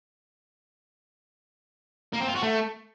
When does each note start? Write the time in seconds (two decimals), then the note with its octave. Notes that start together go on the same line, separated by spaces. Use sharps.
2.13 A#3
2.21 C4
2.28 F4
2.35 F#4
2.43 A3